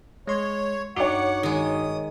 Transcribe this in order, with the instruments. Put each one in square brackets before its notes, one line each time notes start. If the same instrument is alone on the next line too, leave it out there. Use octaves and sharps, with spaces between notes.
[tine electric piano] G#3 C6 [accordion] C#5
[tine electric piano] G2 D#4 F#4 [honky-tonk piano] C#5 D6 [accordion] F#5
[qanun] D#3 G#3 [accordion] D#6